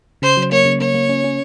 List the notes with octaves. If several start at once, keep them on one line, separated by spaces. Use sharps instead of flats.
C#3 C5
F#3
A#3 C#5
C#3
A#3 C#5
A#3
C#4
C#4